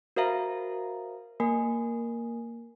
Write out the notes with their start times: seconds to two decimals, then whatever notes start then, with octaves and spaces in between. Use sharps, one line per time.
0.16 F#4 A#4 C5 E5 F5 A#5
1.40 A#3 A#4 G#5